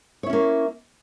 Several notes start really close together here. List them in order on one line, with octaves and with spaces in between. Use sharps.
C#5 E4 C#4 A#3